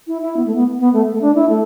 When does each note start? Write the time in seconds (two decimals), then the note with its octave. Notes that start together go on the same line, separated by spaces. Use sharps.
0.07 E4
0.22 E4
0.36 B3
0.46 A3
0.55 B3
0.79 B3
0.93 A3
1.12 A3
1.21 D4
1.35 E4
1.49 A3